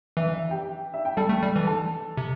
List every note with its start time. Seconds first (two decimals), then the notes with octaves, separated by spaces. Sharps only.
0.17 E3 E5
0.34 E5
0.49 G4 G5
0.94 E5
1.05 G5
1.17 G3 A4 A5
1.29 A3
1.43 G3
1.56 E3
1.67 A4 A5
2.17 C3